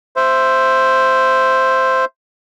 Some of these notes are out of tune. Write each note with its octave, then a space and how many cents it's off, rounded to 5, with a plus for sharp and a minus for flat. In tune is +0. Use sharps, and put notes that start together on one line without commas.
C5 +0 E5 +15